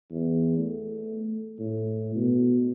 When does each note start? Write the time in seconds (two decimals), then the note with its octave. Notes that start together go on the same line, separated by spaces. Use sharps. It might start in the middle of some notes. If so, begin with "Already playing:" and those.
0.11 E2
0.57 A3
1.59 A2
2.15 B2